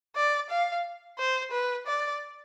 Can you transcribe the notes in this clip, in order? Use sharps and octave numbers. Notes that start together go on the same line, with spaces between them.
D5
F5
C5
B4
D5